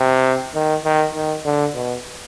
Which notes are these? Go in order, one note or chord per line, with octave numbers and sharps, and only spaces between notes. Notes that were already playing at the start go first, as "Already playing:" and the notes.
Already playing: C3
D#3
D#3
D#3
D3
B2